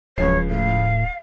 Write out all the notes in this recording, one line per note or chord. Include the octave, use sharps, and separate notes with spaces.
D1 C#2 F#2 F3 C#5 C7
A2 F5